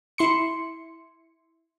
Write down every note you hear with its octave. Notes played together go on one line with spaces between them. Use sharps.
E4 C6 C#7